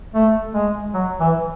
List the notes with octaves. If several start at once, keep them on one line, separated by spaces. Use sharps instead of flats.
A3
G#3
F#3
E3